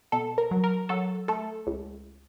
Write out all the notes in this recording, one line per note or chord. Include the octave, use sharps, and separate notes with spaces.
B2 A4
A#4
F#3
A#4
F#3 A4
A3 A4
C#2